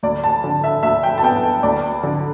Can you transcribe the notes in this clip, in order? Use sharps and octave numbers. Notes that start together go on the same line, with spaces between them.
D2 D5
A5
D3
E5
D2 E5
G5
A5
B3 G5
G5
D2 D5
D3